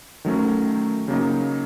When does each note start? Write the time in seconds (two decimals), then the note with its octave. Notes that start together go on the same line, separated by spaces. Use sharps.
0.25 D#3 F#3 A3 C#4
1.08 C#3 F#3 A#3 D#4